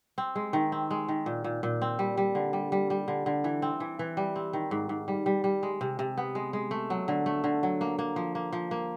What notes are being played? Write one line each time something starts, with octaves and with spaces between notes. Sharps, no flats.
C4
G#3
D#3
C4
G#3
D#3
A#2
A#2
A#2
C4
G3
G3
D3
G3
G3
G3
D3
D3
E3
C4
E3
E3
G3
C4
D#3
G#2
G#2
G3
G3
G3
G#3
C3
C3
B3
G#3
G#3
A3
F#3
D3
A3
D3
F#3
A#3
A#3
F3
A#3
F3
A#3